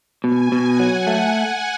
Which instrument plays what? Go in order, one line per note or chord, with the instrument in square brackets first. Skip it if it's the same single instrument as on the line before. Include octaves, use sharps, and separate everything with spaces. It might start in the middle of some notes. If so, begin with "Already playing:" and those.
[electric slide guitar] B2 [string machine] G#5
[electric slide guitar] B2
[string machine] F#5
[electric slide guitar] F#3
A3